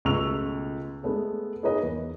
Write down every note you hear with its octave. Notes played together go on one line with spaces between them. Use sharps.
C#2 B2 A3 C#6 E6 F7
G#3 A3 B3 A4
D#4 G#4 A#4 B4 C#5 D#5
E2